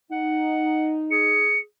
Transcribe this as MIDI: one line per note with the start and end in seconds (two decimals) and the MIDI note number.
0.12 1.45 63
0.12 0.95 78
1.11 1.62 68
1.11 1.59 97